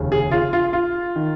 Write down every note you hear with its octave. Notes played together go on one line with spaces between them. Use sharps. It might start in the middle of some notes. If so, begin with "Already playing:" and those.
Already playing: F1 D#2 C#3
G#4
F4
F4
F4
D#3